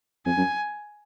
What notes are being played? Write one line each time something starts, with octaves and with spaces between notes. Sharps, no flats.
F2 G#5
F#2